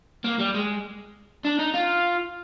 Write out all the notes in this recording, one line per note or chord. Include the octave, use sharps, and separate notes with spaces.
A#3
G3
G#3
D4
D#4
F4